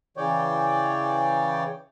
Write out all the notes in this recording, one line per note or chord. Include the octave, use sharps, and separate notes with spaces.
C#3 E3 C#5 D5 G5